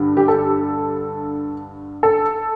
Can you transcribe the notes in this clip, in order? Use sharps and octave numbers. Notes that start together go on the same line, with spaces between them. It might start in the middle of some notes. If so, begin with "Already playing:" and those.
Already playing: G2 D3 G3
G4
A4
A4